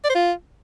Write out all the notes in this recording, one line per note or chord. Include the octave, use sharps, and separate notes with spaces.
D5
C5
F4